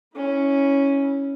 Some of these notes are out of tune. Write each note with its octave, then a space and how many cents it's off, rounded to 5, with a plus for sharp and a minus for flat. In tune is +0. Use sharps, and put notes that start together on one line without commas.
C#4 +0 E4 -25